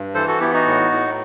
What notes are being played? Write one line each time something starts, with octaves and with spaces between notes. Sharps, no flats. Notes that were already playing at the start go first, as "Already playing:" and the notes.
Already playing: G2
E3 A4 C5
F#4 A4
B3 E4 G4
D#4 F#4
A2
A2